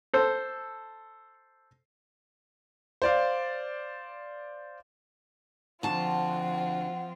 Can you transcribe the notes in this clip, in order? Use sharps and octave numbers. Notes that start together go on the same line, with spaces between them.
A4 C5
C5 D5 F5
D2 F3 C4 F4 F#5 A5